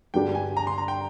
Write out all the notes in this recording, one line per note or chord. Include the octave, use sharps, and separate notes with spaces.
G2 D3 G3 D4 G4 G5
G#5
A#5
C6
A#5
G5